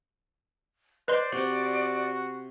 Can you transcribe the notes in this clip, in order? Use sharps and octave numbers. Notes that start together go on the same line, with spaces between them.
B4 C5 D5 D#5 C6
C3 F#4 C5